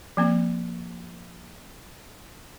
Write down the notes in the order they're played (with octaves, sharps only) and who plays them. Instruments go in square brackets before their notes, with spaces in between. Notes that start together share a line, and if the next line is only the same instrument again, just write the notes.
[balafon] F3 A#3 C4